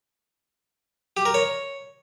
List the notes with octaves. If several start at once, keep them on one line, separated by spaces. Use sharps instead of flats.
G4
A#4
C#5